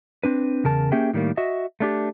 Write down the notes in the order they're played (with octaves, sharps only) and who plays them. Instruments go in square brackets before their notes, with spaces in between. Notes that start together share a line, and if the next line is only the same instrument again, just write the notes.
[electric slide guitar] C4 D4 B4
E2 C#3 A#4 A5
A#3 C#4 G4 G#4 E5 G5
A2 D#3 G3 A3 A#3
F#4 D#5 E5
A3 D4 G4